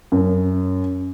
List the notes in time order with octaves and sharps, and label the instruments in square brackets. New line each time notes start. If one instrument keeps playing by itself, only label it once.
[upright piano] F#2